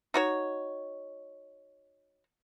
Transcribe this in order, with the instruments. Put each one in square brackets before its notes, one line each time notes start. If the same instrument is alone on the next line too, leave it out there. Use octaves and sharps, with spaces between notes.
[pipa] D#4 F#4 C#5